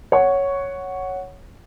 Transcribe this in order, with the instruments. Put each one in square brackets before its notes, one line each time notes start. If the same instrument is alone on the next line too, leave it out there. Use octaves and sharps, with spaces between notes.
[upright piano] C#5 F#5 C#6